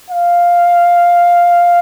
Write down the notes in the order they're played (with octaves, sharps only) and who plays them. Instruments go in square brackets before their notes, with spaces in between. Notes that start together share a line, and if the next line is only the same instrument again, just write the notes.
[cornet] F5